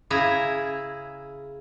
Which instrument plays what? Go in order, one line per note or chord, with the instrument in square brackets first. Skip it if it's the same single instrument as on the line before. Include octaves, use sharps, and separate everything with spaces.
[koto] C#3 E4 G#4 E5 A#5